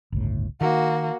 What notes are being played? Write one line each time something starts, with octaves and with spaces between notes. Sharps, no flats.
G1 C#2 A2
D#3 A#3 F#4